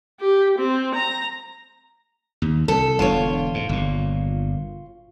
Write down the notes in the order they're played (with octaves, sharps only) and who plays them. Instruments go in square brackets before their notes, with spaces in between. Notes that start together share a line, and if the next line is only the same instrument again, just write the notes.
[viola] G4
C4
A#5
[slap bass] D#2
[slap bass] C2 [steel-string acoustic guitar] A4
[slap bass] E1 D3 [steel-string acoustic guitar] F4 C#5
[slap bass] G#2
G1 A#2